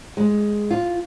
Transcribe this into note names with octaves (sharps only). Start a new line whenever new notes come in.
G#3
F4